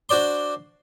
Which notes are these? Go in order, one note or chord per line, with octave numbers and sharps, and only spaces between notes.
D4 F#4 C5 D5 C6